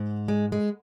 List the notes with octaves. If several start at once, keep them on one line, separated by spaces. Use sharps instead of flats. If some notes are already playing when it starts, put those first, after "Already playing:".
Already playing: G#2
G#3
G#3